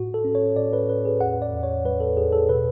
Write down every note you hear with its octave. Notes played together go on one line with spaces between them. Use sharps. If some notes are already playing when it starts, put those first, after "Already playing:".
Already playing: A2 F#4
A4
C#4
C#5
A2 D5
B4
C#4 B4
G#4
E2 F#5
D5
E2
C#5
F#3 B4
A4
E2 G#4
A4
B2 B4